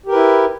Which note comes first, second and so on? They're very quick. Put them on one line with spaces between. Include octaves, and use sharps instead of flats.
G4 A#4 B4 E4